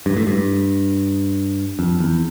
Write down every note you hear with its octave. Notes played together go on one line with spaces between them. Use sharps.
G2
A2
G2
F2
E2